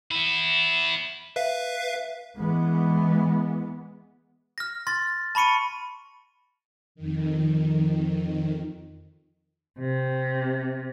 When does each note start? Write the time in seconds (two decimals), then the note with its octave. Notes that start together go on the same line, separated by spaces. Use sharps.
0.11 B3 E4
1.36 B4 E5 F5
2.38 E3 G#3 B3
4.58 F6 A#6
4.87 C6 A6 A#6
5.35 A5 B5 C#6 C#7 D#7
6.95 F2 D#3
9.78 C3